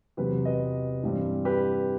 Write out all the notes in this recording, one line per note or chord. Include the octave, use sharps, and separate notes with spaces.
E2 C3 F#3 C4 G4 B4
B4 D#5
G2 E3 G3 C4
G4 B4